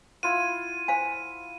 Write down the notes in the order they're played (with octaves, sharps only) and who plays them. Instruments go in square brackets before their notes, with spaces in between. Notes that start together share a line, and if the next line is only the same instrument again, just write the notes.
[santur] E4 F4 F#5 [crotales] D#7
[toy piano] C5 F5 G#5